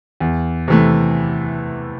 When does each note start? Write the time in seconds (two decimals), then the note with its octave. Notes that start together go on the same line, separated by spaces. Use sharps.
0.20 E2
0.68 C3 E3 A3